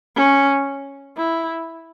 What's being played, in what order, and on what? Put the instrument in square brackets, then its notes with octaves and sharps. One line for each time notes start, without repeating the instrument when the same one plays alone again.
[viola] C#4
E4